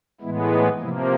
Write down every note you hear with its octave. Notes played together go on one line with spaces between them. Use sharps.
A2 E3 G#3 B3 E4
D#4
C3 F3 A#3 E4